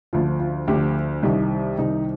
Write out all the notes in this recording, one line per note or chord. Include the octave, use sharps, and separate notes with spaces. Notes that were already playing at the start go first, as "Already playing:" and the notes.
D2 D3 F3 F4
F4
D2 D3 F3 G4
C2 C3 D#3 D#4
C2 C3 D#3 D#4